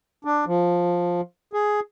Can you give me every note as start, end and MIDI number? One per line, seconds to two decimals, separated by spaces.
0.25 0.45 62
0.47 1.21 53
1.53 1.80 68